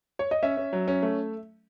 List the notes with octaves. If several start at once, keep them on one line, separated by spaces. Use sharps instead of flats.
C#5
D#5
C#4 E5
C#4
F#3
C#4
A3